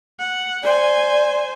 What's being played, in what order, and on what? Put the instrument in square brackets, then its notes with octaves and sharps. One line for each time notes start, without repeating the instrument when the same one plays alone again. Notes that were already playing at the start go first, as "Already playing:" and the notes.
[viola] F#5
[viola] C5 G#5 [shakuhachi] D5